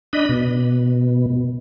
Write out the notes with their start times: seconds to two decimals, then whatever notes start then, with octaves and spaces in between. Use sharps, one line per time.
0.13 D4 D#5 B5
0.29 B2